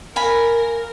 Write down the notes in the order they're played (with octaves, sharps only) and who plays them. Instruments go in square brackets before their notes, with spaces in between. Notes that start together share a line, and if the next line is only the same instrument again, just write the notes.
[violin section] A#4 [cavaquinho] F5 G#5 B5